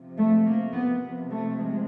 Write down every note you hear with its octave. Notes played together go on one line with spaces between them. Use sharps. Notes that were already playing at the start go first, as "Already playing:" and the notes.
Already playing: C3 F3
A3
A#3
B3
C3 F3
A3
G#3